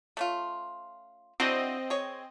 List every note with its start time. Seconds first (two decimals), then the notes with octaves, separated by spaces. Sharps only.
0.17 A3 C#4 F4
1.40 C4 D4 E4 F#4 D#5
1.90 G#4 C#5